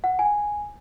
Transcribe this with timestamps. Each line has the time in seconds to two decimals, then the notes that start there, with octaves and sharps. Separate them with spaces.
0.04 F#5
0.19 G#5